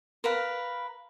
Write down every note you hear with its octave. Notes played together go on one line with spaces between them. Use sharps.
A#4 B4 F5